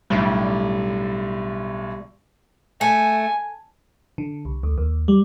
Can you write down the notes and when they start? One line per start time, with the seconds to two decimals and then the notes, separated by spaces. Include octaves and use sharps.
0.10 B1 A2 D3 G3
2.81 A3 G#5
4.18 D3
4.45 C2
4.63 D2
4.78 D#2
5.08 G3